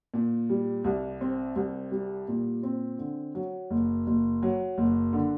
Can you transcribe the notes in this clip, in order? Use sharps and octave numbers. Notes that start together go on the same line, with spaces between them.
A#2
G3
C2
C4
C2
G3
A#2
C4
D3
F#3
F#1
F#1
F#3
F#1
D3